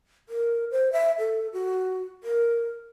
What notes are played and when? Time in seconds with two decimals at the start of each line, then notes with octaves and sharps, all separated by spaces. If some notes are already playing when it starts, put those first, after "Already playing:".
0.29 A#4
0.71 C5
0.92 E5
1.19 A4
1.53 F#4
2.24 A#4